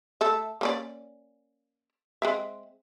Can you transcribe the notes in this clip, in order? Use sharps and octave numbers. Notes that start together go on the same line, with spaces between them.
A3 A4 E5
A#3 C#4 D5
G#3 C4 E5